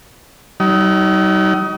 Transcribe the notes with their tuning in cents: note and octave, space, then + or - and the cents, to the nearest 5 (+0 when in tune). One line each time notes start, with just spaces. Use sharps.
G3 -45 D#4 +20